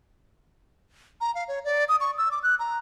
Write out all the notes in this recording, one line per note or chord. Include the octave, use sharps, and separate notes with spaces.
A#5
F5
C#5
D5
D#6
C#6
E6
D6
F#6
A#5